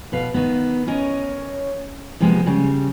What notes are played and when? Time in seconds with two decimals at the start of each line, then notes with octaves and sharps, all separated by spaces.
0.12 B2 B4 F5
0.34 D#3 B3
0.87 C#4 A#4 C#5 D#5
2.20 C3 F3 G3 G#3 A#3 B3
2.46 C#3 G3